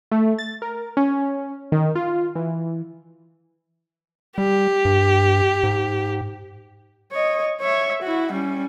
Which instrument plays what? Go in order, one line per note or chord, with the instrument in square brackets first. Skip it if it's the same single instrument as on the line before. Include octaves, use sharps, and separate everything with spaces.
[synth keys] A3
A6
A#4
C#4
D#3
F4
E3
[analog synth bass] G3 [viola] G4
[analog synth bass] G2
G#2
[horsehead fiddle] C#5 D#5
C#5 E5
E4 F#4
G3 C#4